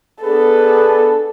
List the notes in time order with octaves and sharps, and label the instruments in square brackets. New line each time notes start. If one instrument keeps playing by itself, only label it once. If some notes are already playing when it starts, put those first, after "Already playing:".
[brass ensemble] B3 D4 G#4 [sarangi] A4 [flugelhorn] B4